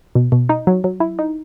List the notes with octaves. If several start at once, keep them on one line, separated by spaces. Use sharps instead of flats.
B2
B2
D#4
F#3
F#3
E4
D#4